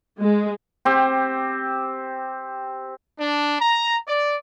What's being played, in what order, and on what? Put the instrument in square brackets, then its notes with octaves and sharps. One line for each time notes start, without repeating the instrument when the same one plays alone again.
[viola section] G#3
[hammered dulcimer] C4 G4
[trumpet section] D4
A#5
D5